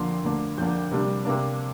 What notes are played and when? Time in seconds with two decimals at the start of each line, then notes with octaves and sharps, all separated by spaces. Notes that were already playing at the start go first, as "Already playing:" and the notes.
Already playing: F2 D3 A#3 D4 C6
0.24 D2 D3 A#3 D4
0.58 F2 D3 A#3 D4 G6
0.91 C3 G3 A#3 D4
1.25 C3 A#3 D4